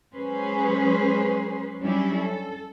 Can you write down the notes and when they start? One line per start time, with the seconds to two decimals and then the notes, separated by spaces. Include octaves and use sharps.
0.14 F#3 G#3 C#4 G#4 B4 C5
1.80 F#3 G3 C#4 D4 E4 G4
2.17 A4